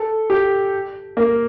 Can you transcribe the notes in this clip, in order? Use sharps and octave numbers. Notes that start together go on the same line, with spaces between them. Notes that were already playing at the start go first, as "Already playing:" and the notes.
Already playing: A4
G4
A#3